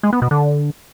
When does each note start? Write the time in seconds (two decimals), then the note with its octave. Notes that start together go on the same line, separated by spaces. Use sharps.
0.03 G#3
0.13 B3
0.22 B2
0.31 D3